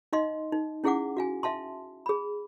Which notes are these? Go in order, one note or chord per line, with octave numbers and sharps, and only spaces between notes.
D#4 D#5 F5 C6
D#4
C#4 E4 G#4 F5 F#5 D6
F#4 F5 G#5
E5 F5 A5 C6
G#4 B5